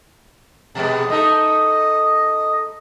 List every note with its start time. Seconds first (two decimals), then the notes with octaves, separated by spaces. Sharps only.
0.75 B2 G#3 B3 A5
1.10 A3 D#4 A4 D#5